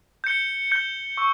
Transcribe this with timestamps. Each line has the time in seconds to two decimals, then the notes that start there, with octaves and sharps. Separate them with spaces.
0.24 G6 C#7 G7
0.71 G6 C#7 G7
1.17 C#6 E6